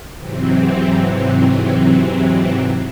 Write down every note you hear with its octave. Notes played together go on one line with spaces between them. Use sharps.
G#2 C3 E3 F#3 C4